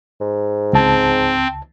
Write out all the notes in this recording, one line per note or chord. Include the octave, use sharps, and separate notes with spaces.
G#2
C#2 C4 A5